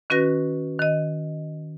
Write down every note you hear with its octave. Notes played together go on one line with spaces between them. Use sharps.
D#3 C#4 F#4 B4 A#6
D#3 D#5